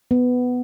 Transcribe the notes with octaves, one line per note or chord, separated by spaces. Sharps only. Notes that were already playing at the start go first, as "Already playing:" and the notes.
B3